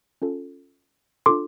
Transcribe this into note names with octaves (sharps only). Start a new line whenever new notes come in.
C#4 F4 A4
D4 F4 A4 C6 D6